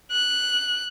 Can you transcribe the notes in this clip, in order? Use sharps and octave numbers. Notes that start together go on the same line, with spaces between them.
F#6